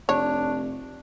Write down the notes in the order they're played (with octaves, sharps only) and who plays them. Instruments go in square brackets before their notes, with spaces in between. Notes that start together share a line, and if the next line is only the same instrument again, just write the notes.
[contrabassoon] F1 [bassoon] D4 [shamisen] C#5